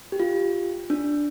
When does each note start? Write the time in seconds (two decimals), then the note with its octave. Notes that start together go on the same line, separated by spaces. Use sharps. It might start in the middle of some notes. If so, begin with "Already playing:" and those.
0.12 G4
0.20 F4
0.90 D4